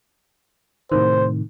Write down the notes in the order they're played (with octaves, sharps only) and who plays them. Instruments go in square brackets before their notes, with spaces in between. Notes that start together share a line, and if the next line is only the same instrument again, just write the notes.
[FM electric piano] A2 C3 D#3 [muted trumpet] C5